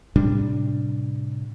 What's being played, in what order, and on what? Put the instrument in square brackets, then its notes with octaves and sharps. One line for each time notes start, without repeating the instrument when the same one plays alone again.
[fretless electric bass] A2 C3 G3 D4